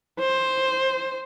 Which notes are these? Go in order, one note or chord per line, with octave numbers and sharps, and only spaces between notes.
C5